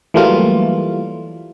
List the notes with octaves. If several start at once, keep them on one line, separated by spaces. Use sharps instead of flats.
E3 F#3 G3 A3 A#3 F4